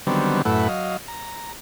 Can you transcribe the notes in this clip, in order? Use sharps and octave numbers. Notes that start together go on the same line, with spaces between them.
D3 D#3 F#3 G3 B3 C4
F#2 A2 A3 E4 B4 F#5
F#3 D#5 F5
A#5